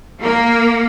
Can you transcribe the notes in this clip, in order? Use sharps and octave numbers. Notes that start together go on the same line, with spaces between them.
A#3